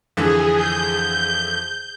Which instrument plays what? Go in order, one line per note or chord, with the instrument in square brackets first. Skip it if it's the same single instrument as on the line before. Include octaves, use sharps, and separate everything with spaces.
[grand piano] F2 D3 E3 [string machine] G#4
[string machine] G6